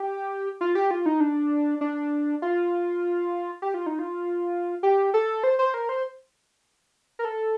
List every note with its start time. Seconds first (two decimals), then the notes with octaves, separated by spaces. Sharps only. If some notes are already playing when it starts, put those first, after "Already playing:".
Already playing: G4
0.61 F4
0.75 G4
0.91 F4
1.06 D#4
1.20 D4
1.81 D4
2.42 F4
3.62 G4
3.74 F4
3.86 D#4
3.99 F4
4.83 G4
5.14 A4
5.44 C5
5.59 C5
5.74 A#4
5.89 C5
7.19 A#4
7.25 A4